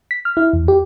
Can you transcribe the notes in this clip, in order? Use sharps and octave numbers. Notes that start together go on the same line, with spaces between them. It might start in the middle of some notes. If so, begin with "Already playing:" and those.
B6
F6
E4
E2
G4